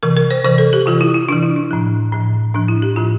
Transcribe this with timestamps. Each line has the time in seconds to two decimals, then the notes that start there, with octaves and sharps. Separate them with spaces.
0.03 C3 E3 A#4
0.17 A#4
0.31 C5
0.44 C3 E3 C5
0.58 A4
0.73 G4
0.86 C3 E3 F4
1.01 E4
1.14 E4
1.28 C3 D4
1.32 E3
1.43 E4
1.56 D4
1.71 A2 F3
2.12 A2 F3
2.55 A2 F3 D4
2.68 E4
2.82 G4
2.96 A2 F3 F4